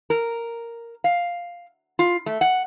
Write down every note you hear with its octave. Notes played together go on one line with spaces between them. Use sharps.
A#4
F5
F4
A3
F#5